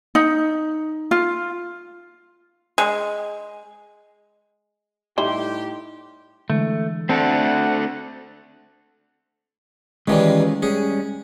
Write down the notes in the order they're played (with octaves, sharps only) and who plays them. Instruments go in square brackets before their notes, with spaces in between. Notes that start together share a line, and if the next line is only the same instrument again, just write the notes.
[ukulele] D#4
F4
[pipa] G#3
[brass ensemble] A2 G4 [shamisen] G3 E4 [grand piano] D#4 [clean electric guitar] C6
[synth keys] D3 E3 G#3 [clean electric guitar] A3
[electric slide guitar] A3 D4 A4 [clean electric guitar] C4 [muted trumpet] F#5 [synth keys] C#7
[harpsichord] D#3 E3 G3 [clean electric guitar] G#3 C#4 F4
[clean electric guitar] G3 G#3 C#4 [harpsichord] G#4